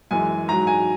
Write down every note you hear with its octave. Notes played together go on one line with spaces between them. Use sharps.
F#2 E3 G#3 G#5
G#2 F#3 A#5
G#5